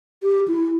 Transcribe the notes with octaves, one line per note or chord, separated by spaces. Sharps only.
G4
E4